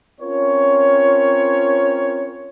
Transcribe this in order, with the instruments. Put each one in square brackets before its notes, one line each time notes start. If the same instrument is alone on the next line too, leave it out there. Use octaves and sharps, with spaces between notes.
[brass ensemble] C4 C#4 F4 A#4 C#5